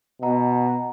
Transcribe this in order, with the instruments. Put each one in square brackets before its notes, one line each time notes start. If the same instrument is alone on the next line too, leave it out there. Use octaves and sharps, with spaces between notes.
[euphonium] B2 [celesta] D#5 F#5 A#5